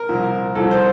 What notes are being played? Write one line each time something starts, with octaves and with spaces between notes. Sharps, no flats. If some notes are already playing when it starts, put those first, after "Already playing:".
Already playing: A#4
C2 A#2 F3
C2 A#2 F3 A4
C5